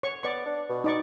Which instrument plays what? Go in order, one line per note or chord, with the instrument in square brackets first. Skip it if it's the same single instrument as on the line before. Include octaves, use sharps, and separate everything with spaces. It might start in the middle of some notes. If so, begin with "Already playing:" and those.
[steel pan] C#5 C#6
[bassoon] B3 [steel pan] D5 C#6
[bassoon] D4
B2
[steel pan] D#4 D5 C#6